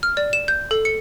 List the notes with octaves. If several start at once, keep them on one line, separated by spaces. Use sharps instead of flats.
F6
D5
E7
G6
A4
C#7